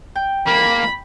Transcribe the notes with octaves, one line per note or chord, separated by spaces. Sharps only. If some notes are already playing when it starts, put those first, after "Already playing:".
G5
A#3 B5